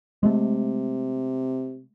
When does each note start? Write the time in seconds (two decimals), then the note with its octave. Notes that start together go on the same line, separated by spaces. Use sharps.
0.23 C3 G#3 A3